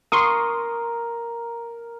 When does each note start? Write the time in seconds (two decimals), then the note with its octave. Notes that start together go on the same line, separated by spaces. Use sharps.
0.12 A#4 C6 C#6 D#6